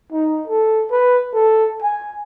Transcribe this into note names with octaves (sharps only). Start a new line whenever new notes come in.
D#4
A4
B4
A4
G#5